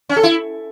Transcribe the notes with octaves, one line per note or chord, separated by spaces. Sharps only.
C#4
A4
E4